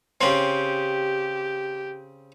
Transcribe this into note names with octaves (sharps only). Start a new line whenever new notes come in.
C#3 C4 G4